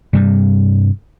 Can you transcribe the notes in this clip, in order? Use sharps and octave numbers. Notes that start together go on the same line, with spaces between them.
G2 C3 G3